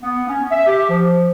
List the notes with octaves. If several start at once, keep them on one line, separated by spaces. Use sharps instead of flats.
B3
C#4
E5
G4
F3